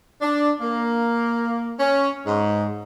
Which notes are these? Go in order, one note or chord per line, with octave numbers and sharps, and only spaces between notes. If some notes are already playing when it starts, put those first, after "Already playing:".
D4
A#3
C#4
G#2